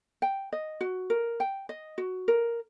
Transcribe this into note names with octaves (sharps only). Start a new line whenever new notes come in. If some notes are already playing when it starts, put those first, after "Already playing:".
G5
D#5
F#4
A#4
G5
D#5
F#4
A#4